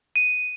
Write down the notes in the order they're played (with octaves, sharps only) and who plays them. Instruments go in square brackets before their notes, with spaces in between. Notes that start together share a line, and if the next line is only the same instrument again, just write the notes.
[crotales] D#7